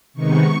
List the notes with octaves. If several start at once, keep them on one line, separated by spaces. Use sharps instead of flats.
C3 D#3 G#3 B3 D#4 C#6